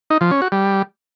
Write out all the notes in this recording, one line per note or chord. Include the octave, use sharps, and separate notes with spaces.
D#4
F3
C#4
F#4
G3